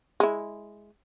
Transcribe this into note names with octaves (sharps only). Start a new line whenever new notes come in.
G#3 E4